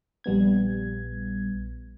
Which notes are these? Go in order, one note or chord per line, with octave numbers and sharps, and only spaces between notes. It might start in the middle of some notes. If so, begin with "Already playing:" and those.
A#1 G3 B3 G#6